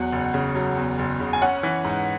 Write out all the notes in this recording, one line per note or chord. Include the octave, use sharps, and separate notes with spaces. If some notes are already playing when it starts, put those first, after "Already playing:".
Already playing: E2 F#3 F#5
F#1
C#3
F#3
E2
F#1
C#3
G#5
C#4 F#5
E3
G#2